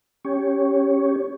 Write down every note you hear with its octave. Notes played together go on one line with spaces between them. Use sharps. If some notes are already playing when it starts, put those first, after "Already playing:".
C#4 G4 C#5